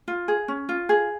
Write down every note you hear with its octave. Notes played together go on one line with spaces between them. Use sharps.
F4
G#4
C#4
F4
G#4